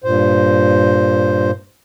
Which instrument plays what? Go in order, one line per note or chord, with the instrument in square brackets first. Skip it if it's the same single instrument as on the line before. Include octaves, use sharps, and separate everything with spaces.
[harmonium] G2 A#2 C5